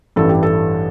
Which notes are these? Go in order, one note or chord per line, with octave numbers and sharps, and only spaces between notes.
A1 G2 E3 A4
G4
A4